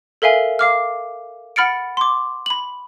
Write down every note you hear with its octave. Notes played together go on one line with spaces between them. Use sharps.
A4 A#4 E5 F5 G#5
F5 D6 F6
F#5 B5 F6 A6 C#7 D7
C6 D6
B5 F#7